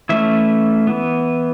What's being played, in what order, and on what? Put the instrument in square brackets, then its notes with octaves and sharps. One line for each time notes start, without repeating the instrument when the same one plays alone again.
[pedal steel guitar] E3 A3 C#4 E4 E5
E3 B3